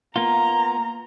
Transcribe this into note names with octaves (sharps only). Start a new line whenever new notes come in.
A#3 B3 F4 A#5